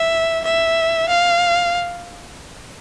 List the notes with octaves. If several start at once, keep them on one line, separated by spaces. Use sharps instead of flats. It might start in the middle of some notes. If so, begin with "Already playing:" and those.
Already playing: E5
E5
F5